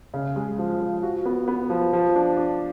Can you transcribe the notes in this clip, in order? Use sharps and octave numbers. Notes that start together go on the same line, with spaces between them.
C#3
G#3
F3
F3
F#4
B3
B3
F3
F3
D4
D4